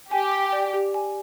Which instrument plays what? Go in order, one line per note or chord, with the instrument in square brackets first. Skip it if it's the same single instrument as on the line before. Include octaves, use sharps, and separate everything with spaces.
[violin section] G4 [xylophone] G#5
[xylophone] D6
D5
G4
G#5